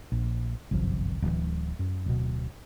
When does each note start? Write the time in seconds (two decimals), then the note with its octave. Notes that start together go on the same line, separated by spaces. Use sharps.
0.12 A#1
0.71 G1 C2 F#2 F3
1.22 D1 E3
1.79 F#2
2.06 D1 B2